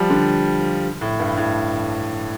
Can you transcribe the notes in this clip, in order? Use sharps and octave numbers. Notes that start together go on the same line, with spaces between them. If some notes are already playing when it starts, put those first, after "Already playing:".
Already playing: F3 G3
D3
A2
G2
A2